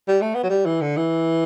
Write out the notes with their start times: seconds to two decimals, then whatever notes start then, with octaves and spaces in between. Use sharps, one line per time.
0.08 G3
0.21 A3
0.34 B3
0.43 F#3
0.50 G3
0.66 E3
0.81 D3
0.97 E3